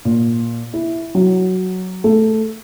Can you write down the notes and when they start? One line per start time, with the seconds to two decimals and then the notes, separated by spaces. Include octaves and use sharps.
0.05 A#2
0.74 E4
1.15 F#3
2.04 A3